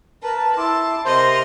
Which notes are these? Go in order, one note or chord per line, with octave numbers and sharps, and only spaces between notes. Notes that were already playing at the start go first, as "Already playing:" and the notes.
A#4 B4 A5
E4 A5 C6 D6
C3 A#4 C5 D#5 C6